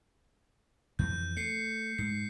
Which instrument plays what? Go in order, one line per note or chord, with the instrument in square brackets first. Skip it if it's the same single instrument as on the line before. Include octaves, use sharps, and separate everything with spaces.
[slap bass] F2 E3 [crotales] G6
[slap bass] A3 [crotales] C7 C#7
[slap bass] G#2 [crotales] C7